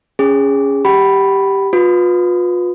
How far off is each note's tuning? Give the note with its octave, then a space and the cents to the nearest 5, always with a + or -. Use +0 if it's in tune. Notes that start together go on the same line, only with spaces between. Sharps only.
C#4 +10 G#4 -15
G4 +0 F#5 +40 B5 +0
F4 +35 B4 +0 D#6 +0